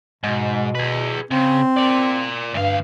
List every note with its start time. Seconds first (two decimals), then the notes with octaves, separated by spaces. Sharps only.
0.23 G#2 B2
0.75 G#4 B4
1.31 C#3 C4
1.77 A#4 D5
2.54 D2 G2 F5